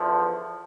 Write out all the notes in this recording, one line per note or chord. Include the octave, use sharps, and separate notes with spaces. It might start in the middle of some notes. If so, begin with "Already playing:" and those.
Already playing: E2 D3 F3